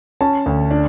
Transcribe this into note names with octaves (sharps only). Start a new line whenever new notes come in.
C#4 A5
D2
D4